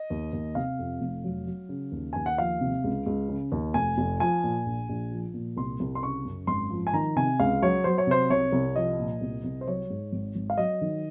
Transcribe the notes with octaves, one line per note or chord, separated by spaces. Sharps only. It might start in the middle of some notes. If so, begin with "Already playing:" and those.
Already playing: D#5
D#2
D#2
C3 F5
F2
F1
F#3
F#3
C#3
D#2
D#2 G#5
F#5
F3 F5
C3
C#2
C#2
C#3
D#2
F1 G#5
F1
F3 G#5
A#2
A#1
A#1
F3
A#2
C2 C6
C2
C6
C#3 C#6
F#2
G#1 C6
F3
G#5
D#3 A#5
C3 G#5
C#2 F5
F#3 C#5
F#3 C5
C#5
C3 C5
C2 C#5
C2
F3 D#5
A#2
C2
C2
C5
F#3 C#5
G#2
G#1
G#1
F5
F#3 D#5
D#3